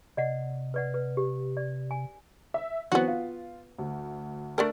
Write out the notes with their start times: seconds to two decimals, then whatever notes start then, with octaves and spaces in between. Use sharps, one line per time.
0.17 C3 D5 D#5 F#5
0.74 B4 D5 F#5
0.94 B4
1.17 G4
1.57 D5
1.91 G#5
2.54 E5
2.92 E3 F#3 B3 C4 F#4
3.08 F4
3.78 D2
4.58 A3 D4 A#4